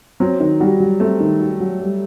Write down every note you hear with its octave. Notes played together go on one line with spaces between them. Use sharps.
F#3 C4
D#3
G3 F#4
F#3
A3 C4
D#3
F#4
F#3
G3